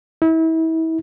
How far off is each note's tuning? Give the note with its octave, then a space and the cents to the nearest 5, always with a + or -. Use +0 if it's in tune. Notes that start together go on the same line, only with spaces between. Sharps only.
E4 -35